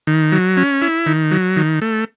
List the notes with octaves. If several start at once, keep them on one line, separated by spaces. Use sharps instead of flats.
D#3
F#3
C#4
E4
D#3
F#3
D#3
A3